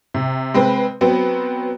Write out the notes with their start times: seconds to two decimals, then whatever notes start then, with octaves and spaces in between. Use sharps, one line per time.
0.14 C3
0.54 G#3 C4 B4
1.01 F#3 B3 C4